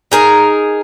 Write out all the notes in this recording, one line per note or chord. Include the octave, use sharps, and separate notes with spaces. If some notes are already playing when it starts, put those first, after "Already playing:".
D#4 G#4 A#4